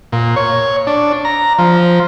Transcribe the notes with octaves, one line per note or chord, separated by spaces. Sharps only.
A#2
C#5
D4
A#5
F3